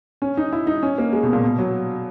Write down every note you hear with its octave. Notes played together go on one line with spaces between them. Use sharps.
C#4
D#4
E4
D#4
C#4
A#3
G#3
B2
A#2
B2
F#3